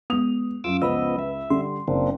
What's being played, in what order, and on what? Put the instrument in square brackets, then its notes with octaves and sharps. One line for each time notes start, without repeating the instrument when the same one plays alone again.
[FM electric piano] G#3 B3 [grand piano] D#6 F7
[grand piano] F#2 F4 [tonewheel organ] D6 E6
[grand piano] C#2 [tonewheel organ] F3 B3 D#5 [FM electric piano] B4 B5 E6
[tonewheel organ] E5
[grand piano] D3 G3 [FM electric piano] C6
[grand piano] F#1 [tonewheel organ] A#3 C4 D4